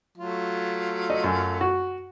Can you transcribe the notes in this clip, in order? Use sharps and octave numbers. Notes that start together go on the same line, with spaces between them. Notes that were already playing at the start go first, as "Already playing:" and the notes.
F#3 A3 F4
D#5
F#2
F#4